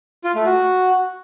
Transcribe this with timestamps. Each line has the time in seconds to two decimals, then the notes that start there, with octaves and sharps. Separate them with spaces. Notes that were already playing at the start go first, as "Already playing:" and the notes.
0.24 F4
0.35 A3
0.46 F#4